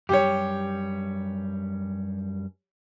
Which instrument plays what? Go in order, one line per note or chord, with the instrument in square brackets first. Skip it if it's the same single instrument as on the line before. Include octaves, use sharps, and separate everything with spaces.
[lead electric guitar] F#2 G3 [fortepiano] G4 C#5